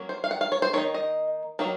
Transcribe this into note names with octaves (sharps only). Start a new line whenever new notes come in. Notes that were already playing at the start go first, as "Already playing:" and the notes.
Already playing: F#3 A#3 C#4
C5
F5
F#5
F5
C#5
C5
D#3 A#3 D#4 C#5
D#5
D#3 F#3 A#3 D#4